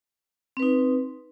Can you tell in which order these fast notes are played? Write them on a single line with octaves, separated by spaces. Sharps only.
C4 B4 D#4